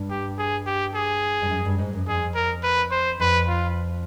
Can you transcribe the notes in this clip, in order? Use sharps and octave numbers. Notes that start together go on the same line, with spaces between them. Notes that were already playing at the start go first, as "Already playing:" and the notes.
Already playing: G2
G4
G#4
G4
G#4
G2
F#2
G2
G#2
F#2
F2 G#4
A#4
B4
C5
F2 B4
F4